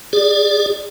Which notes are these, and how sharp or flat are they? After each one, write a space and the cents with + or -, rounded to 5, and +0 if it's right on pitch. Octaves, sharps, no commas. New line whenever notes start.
G#4 -20 D5 +0